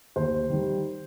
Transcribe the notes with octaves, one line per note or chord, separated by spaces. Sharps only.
D#2 C5
D#3 G3